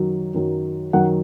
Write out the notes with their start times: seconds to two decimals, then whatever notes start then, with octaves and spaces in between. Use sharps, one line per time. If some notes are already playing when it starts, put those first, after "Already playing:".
Already playing: F#2 D#3 F#3
0.34 F#2 D#3 F#3
0.93 F#2 D#3 F#3 F#5